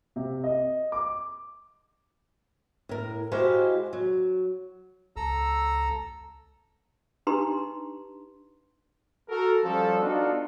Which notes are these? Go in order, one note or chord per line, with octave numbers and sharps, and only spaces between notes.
C3
D#5
D6
A2 A#4
G#3 E4 F#4 G4 C5 F5
F#3
C#2 A4 A#5 E6
D4 D#4 G4 B4 A#5 C6
F#4 A4 A#4
F3 G3 C#4 A4
B3 D4 D#4 F4 F#4 A4